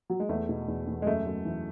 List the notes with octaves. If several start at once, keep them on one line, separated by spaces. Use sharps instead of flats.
F#3
G#3
E2 A3
B2
E2
E2
G#3
F#2 A3
F#2
E3